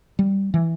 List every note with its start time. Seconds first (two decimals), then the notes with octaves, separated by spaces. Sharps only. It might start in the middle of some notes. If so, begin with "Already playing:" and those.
0.19 G3
0.54 E3